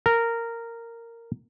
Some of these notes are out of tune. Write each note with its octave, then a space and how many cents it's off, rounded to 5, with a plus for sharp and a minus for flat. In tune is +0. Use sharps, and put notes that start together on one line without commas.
A#4 -10